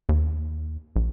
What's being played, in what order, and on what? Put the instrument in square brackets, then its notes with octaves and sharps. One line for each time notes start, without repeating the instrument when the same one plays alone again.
[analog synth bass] D#2
A#1